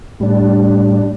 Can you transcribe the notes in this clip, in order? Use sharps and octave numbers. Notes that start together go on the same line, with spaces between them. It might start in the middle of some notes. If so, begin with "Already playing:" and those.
A2 G3 D4